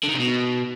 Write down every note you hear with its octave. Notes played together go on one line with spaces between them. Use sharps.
D3
D#3
C3
B2